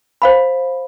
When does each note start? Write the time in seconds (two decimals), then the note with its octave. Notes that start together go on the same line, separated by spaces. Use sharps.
0.22 C5 F5 B5